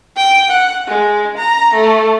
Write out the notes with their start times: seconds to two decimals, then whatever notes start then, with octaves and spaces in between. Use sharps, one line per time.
0.17 G5
0.50 F#5
0.88 G#3
1.37 A#5
1.74 A3